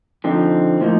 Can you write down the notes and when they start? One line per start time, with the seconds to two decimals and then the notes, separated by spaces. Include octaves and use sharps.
0.24 D3 F3 C4 D#4
0.80 A2 F3 A#3 D#4